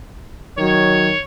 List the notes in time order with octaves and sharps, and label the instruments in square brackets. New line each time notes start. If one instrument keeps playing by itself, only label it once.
[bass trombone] D#3 [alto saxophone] F#3 [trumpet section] C#5